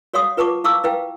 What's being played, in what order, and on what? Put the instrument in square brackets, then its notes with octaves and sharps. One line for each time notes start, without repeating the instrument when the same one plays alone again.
[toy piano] F#4 C#5 F5 F#5 C6 D#6
F4 B4 F#5 A5 C#6 D6
E4 F5 A5 C#6 D6 E6
E4 B4 F5 G5